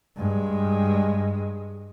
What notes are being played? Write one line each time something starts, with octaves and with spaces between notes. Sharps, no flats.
G2 G#3